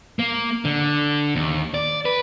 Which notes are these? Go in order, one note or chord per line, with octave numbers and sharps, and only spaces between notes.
A#3
D3
D#2
D5
B4